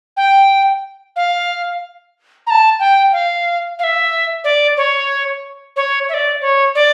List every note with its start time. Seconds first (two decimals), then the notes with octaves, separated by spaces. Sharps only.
0.17 G5
1.16 F5
2.47 A#5
2.50 A5
2.80 G5
3.12 F5
3.79 F5
3.83 E5
4.44 D5
4.77 C#5
5.76 C#5
6.09 E5
6.14 D5
6.41 C#5
6.75 D5